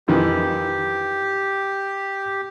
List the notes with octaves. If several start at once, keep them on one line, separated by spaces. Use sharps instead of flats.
F2 D#3 E3 G4